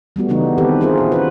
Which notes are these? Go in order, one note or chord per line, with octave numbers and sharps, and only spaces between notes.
G3 A3 B3 F#4
C#3 E3 G3 B3 D#4
D#3 C4 G4 A4 B4
C#4 E4 F4 G#4 A#4 C5
A#2 F#4
D4 F4 B4